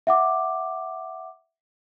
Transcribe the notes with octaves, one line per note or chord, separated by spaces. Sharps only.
E5 F#5 D6